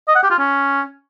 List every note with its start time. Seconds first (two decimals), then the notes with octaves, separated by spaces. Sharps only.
0.08 D#5
0.16 F#5
0.23 G4
0.31 F4
0.38 C#4